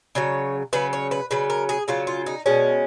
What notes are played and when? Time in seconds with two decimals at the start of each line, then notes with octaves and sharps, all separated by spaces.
0.15 C#3 F#3 C#5
0.73 C#3 F#3 B4
0.93 C#5
1.11 B4
1.31 C#3 F#3 B4
1.50 A#4
1.69 G#4
1.88 C#3 F#3 F4
2.07 F4
2.26 D#4
2.46 B2 G#3 C#4